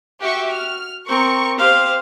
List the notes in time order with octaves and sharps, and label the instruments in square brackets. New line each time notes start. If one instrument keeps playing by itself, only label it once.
[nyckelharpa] F#4 [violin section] G4 E5 C#6
[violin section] F6
[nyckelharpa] C4 [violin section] A#4 C#6
[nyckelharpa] G4 F5 [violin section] C5